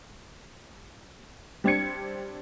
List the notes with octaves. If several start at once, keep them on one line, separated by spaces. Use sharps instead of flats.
G3 C4 D4 G4 G#6 C#7